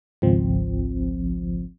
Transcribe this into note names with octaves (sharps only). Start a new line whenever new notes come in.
G#1 C#2 F3 C4